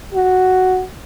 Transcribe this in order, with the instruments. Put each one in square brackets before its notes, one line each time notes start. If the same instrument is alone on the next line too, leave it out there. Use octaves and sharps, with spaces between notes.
[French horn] F#4